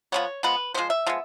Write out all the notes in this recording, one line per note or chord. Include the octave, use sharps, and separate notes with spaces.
F3 G#3 B3 C#5
F3 G#3 B3 B4
F3 G#3 B3 C5
E5
F3 G#3 B3